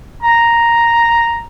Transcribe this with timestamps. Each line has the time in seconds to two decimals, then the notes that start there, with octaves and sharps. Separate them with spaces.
0.23 A#5